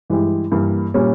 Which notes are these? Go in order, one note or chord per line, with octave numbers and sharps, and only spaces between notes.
G2 E3 G#3 E4 G4
G2 E3 A#3
A#2 G3 C#4